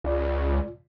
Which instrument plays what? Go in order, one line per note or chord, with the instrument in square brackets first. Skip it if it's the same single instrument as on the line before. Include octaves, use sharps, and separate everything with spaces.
[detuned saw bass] C#2 [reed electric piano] F4 D5